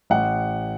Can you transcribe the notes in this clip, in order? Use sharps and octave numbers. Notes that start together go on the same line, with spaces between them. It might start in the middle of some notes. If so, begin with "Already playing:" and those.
A1 F#5